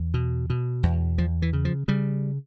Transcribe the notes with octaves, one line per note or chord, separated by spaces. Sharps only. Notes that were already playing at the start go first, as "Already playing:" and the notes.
Already playing: E2
B2
B2
E2
E2 F3
E3
C#3
F3
C#3 G3